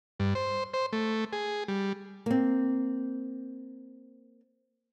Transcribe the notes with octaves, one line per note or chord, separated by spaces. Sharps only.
G2
C5
C5
A3
G#4
G3
A#3 C4